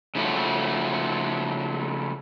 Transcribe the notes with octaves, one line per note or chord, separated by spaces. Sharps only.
C#3 F3 A3 F#4